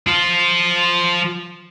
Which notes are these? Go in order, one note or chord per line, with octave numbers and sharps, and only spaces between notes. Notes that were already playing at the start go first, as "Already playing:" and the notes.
F3 F4